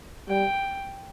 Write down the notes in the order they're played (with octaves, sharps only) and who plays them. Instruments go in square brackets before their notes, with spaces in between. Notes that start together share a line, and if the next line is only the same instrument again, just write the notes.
[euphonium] G3 [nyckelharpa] G5